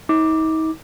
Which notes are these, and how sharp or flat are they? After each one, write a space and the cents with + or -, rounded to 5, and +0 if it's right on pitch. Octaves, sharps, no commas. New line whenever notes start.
D#4 +40 D6 +0